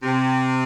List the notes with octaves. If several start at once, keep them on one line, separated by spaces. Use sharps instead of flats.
C3